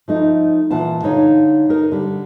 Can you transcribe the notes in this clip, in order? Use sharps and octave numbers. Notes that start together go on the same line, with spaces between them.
F3 A3 D#4
A#2 E3 F4 F#5 A5
D3 D#4 C#5 F5
D#4 A#4
D3 G3